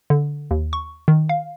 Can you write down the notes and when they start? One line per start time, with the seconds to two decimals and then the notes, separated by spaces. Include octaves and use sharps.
0.10 D3
0.51 D#2
0.73 C#6
1.08 D#3
1.29 F5